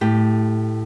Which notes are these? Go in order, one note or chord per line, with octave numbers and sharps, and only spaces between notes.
A2 G4